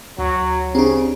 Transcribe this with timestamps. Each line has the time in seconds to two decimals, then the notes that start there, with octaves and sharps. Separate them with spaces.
0.19 D2 F#3
0.75 C#3 C4 D4 G4 G#4 A#5